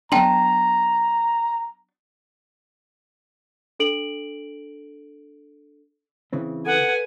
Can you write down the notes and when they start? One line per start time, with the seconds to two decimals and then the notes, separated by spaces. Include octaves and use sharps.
0.12 F#3 B3 D4 G5 A5 A#5 C6
3.80 D4 A4 D7 F#7
6.33 C#3 E3 C4
6.66 A4 B4 F#5 G#5